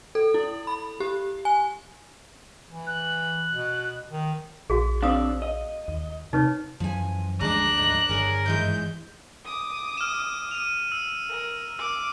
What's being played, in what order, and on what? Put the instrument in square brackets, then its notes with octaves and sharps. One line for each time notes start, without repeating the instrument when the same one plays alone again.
[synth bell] A4
E4
B5
G4
G#5
[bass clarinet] E3
[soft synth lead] F#6
[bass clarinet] B2
D#3
[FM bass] A#1 [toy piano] F#4 G#4
[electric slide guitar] C4 D4 [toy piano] F5 D#6
[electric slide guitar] D#5
[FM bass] D#2
[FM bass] C3 [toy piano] D#4 B4 C#5
[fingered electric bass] F#2 E3 [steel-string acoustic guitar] F3 G#5
[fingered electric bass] D2 F3 G3 [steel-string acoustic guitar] G#3 D5 [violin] D4 F#6 [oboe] A#5
[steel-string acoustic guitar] G#2 [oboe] A#5
[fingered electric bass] G1 [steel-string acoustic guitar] G#4 B4 C#5 [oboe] A#4
[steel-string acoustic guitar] G#2 E3 G#3 [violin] G6
[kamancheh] D6 D#6
[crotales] F6 E7
D#7 F7
E6
[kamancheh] A#4
[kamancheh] D6 [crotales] E6